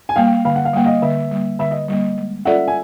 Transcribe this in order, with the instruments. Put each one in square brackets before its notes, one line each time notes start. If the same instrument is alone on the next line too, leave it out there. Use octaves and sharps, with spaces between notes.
[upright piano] G#5
[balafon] G3 A#3 [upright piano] F5 G5
[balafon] D3 [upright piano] F5
[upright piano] F#5
F5
[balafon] G3 A#3 [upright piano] F#5
[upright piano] D#5 F5
[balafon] D3 [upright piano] E5
[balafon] G3 A#3
[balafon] D3 [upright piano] E5
[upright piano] D#5
[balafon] G3 A#3 [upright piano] D#5
[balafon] G#3
[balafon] C#4 F4 A4 D5 [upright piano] E5 F#5
[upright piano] G#5